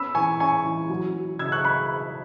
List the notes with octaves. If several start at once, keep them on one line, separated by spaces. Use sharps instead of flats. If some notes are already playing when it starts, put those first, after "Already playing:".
Already playing: B3 C#4 B5 E6
E3 G#5 C#6
C#4 G#5 C#6
E3
F#3
F#3
C#3 E6 G#6
C#6 F#6
B5